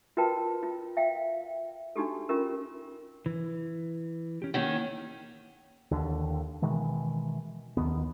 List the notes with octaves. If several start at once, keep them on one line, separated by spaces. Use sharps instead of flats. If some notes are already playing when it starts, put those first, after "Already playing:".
F4 F#4 A#4 B4 G5 A5
F4
E5 F5 G5
D4 D#4 F#4 G4 A4
C#4 F4 G4 A#4
E3
C#4 G4
D#3 A#3 C#4 E4 F#5
D#2 D3
B2 D#3 E3 G#3
D#2 D#3 B3